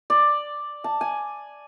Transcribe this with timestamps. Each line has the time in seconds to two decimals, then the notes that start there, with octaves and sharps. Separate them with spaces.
0.10 D5
0.84 A5
1.01 G#5